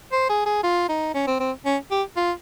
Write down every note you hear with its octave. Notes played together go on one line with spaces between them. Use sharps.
C5
G#4
G#4
F4
D#4
C#4
C4
C4
C#4
G4
F4